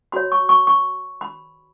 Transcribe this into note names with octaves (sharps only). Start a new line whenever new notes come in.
F#4 C#5 B5
C#6
C#6
C#6
B5